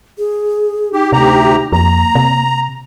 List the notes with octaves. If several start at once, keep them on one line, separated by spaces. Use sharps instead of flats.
G#4
D#4 G4
D2 C3 G4 A#5
F2 A#3 A#5
C3